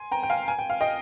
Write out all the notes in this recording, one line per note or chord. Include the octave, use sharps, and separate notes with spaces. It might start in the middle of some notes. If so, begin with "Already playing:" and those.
Already playing: G#5 C6
G5 A#5
G5
F5 G#5
G#5
G5
F5
D#5 G5